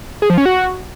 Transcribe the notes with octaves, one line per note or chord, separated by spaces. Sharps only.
G#4
F3
C#4
F#4